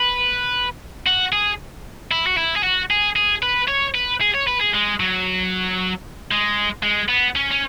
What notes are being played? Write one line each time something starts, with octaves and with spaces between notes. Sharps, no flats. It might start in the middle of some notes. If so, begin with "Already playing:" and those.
Already playing: B4
F#4
G#4
E4
F#4
E4
G#4
F#4
G#4
G#4
B4
C#5
B4
G#4
C#5
B4
G#4
G#3
F#3
G#3
G#3
B3
C#4
C#4